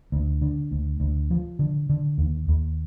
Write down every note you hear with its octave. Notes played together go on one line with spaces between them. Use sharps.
D2
D3
D2
D2
F3
D3
D3
D#2
D#2